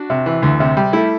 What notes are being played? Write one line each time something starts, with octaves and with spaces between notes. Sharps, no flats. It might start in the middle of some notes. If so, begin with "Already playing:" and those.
Already playing: D4 F#4
C3
E3
D2
C3
G3
A3 E4